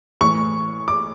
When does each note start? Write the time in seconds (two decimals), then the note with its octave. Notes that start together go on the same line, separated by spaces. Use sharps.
0.21 A2 E3 C#6
0.88 D6